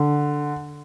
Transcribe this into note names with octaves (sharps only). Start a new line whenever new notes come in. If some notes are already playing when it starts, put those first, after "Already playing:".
Already playing: D3